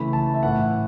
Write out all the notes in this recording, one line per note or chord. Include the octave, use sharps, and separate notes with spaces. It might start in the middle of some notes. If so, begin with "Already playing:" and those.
Already playing: C#3 E3 A3 B5
A5
E5
A2 E3 A3 F#5